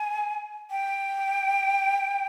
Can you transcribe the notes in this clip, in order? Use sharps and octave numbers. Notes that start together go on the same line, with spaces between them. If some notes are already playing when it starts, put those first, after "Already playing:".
Already playing: G#5
G5